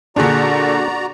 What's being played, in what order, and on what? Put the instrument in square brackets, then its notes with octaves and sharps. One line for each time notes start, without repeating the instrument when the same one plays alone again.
[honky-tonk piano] A#2 D3 [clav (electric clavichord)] D4 G#4 [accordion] F#4 D5 A#5